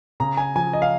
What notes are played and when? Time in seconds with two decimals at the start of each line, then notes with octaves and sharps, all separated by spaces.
0.20 C#3 A#5
0.37 G#5
0.55 F3 G#5
0.73 D#5
0.82 F5